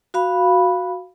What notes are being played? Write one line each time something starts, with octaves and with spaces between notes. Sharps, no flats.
F#4 F5 B5